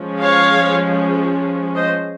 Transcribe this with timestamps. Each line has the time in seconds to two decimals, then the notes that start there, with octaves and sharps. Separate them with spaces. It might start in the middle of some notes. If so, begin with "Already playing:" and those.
Already playing: F3 G#3 C#4
0.21 C#5 F5
1.74 C5 D#5